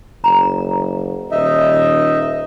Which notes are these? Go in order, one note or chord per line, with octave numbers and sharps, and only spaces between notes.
F#1 A#5
D#1 D#4 D#5 E5